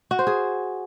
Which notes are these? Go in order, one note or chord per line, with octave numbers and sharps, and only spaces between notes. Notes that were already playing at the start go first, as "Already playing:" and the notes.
F#4
C5
G#4